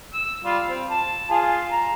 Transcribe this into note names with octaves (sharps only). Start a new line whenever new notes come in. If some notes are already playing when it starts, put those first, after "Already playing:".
E6
G3 F4
C4
A5
F4 G#4
A#5